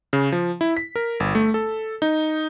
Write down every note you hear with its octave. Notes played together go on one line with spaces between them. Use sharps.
C#3
F3
E4
B6
A#4
G1
A3
A4
D#4